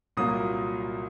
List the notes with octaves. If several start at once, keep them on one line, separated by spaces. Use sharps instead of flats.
C2 A#2 F#3 A#3 D#6